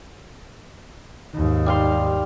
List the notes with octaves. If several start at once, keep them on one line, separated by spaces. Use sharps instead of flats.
D#2 G#2
G3 F5 C6